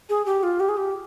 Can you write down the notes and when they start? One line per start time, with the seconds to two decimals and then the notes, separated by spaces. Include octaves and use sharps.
0.09 G#4
0.26 G4
0.43 F4
0.60 G4
0.69 G#4
0.77 G4